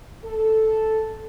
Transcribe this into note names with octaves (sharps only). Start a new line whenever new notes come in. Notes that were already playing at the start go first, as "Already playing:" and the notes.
A4